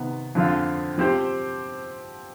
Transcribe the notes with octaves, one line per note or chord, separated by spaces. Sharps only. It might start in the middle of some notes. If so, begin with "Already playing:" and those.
Already playing: C3 D#3 B3
F2 D3 F3 C4 F4
F3 C4 G4 C5